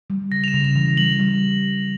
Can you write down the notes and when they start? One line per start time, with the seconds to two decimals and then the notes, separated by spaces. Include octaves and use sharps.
0.10 G3
0.31 C#3 A#6
0.44 F7
0.48 E7
0.54 C#3
0.64 F7
0.76 E3
0.97 G3 F#7
1.19 G3